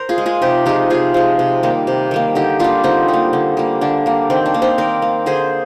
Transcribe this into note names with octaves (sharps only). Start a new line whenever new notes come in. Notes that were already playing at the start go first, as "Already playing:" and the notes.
Already playing: A#4 C5
F4 G#4
G#3
F4 G#4
C3 D#4 G4
F3 G#3 D#4 G4
C3 F4 G#4
F3 G#3
C3
D#3 G3 A#3
C3
D#3 G3 A#3
D3 D#4 G4
G3 A#3 D4 F4
D3 C4 D#4
G3
A#3
D3
G3 A#3
D3 D4
G3 A#3
D#3 C4
D4
A#3
C4 D#4
D#3 A#4 D5
A#3
D3 G#4 C5